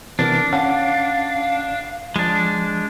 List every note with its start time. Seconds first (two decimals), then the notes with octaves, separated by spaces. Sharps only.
0.19 C3 E3 B3 D4 A#4
0.53 C#4 F5 F#5 A5
2.16 F3 G#3 D4